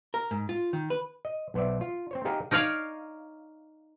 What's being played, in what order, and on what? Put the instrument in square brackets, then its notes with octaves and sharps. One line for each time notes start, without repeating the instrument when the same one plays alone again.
[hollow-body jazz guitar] A#4
G#2
F4
D#3
B4
[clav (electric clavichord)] D#5
B1 B3 C5 D5 E5
F4
C4 C5 C#5
D#4 G4 G#4 A#4 F5 F#5
[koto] D#4 A#4 C#5 D5 F5